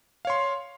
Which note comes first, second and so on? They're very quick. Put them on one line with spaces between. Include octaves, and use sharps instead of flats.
F5 C#5 C6